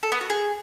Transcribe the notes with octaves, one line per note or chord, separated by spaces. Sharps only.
A4
B3
F#4
G#4